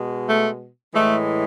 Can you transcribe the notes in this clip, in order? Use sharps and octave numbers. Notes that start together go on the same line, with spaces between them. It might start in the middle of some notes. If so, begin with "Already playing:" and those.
Already playing: B2 G#3
A3
A2 E3 G#3 A3